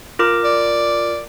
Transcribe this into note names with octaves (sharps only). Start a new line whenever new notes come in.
F4 A#4 D6
D5